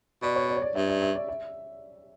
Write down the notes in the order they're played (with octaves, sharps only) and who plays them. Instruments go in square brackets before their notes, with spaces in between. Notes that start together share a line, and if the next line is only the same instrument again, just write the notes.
[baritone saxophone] B2 [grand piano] D5
[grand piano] C#5
D5
C#5
D5
[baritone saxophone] G2 [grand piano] E5
[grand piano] E5
E5
D5
E5